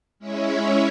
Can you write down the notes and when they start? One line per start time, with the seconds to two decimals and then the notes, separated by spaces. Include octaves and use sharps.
0.19 G#3 C#4 E4 C#5 E5